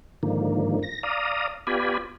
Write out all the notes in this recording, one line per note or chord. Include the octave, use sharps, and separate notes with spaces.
G#2 D3 D#3 F3 A#3
A#6
D5 F5 A#5 D#6
B3 F4 G4 D5 G#5 B5